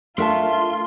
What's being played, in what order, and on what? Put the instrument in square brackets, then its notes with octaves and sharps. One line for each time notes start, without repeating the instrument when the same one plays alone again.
[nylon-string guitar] A3 D4 [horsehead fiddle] F4 [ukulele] A#4 E5 A5 [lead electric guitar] C6